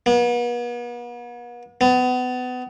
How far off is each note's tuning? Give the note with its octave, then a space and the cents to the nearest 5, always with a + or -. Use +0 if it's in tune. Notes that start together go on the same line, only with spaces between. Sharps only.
B3 -40
B3 +30